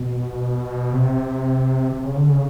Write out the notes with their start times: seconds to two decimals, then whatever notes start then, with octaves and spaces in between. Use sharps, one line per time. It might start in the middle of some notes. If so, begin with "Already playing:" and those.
Already playing: B2
0.93 C3
1.92 C3
2.04 C#3
2.17 D3
2.29 C#3